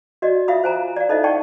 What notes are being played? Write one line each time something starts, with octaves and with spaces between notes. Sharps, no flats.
F#4 D5 D#5
F4 E5 F5 B5 D#6
C5 G#5 A#5
D5 F5
D#4 E4 A4 C5 D#5 E5
D5 F#5 G5 A5 C#6